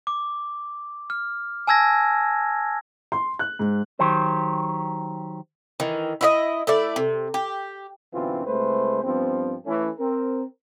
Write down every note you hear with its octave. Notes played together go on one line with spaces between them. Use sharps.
D6
F6
G#5 A5 E6 G#6 A#6
C6
F#6
G#2
D#3 F#3 G4 C5
D#3 E3
E4 F4 D#5
A3 E4 D5
C3
G4
F#2 B2 D3 E3 C4 F4
C2 G#3 A3 B4 C5
G2 F3 B3 C4
E3 A3 C#4
C4 A#4